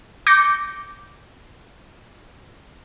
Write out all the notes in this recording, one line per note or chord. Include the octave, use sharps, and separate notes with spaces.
D6 G6 A#6 C#7